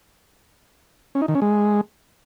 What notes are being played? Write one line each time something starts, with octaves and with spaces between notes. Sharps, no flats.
C#4
D#4
D#3
C#4
G#3